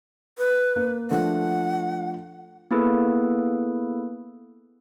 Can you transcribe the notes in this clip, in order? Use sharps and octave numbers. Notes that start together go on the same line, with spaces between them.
B4
A#3
F3 A3 D4 F#5
A#3 B3 E4 G#4 A4 B4